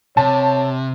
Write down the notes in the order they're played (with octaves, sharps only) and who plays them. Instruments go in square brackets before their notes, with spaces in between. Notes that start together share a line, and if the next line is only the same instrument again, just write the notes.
[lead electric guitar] C3 [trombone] C#5 [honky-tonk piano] A5